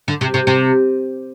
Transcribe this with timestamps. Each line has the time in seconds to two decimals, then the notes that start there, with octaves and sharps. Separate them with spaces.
0.08 D3
0.21 C3
0.34 C3
0.47 C3